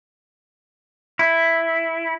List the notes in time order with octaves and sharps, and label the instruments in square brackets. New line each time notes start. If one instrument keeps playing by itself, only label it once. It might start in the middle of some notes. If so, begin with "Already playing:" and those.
[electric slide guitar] E4